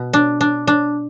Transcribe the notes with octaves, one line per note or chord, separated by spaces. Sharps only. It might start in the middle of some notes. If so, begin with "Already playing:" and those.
Already playing: B2
D4
D4
D4